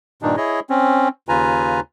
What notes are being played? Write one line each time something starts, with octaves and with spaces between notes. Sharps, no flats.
G2 A#2 D#3 D4 D#4
E4 G#4 C#5 D#5
C4 C#4
D#2 C#3 F4 B4 G#5 A#5